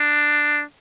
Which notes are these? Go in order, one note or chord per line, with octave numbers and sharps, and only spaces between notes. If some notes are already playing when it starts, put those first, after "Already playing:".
Already playing: D4